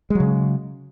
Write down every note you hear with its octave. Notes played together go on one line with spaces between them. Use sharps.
C#3 F#3 G#3